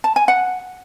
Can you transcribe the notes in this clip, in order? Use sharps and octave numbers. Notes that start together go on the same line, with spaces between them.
A5
G#5
F#5